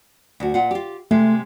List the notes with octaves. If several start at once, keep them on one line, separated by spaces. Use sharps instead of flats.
D2 F#4
A#2 F4 F#5
F4 G4
C3 G#3 A3